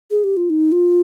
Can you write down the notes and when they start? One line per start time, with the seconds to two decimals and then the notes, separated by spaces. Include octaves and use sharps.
0.11 G#4
0.24 G4
0.37 F4
0.50 D#4
0.72 F4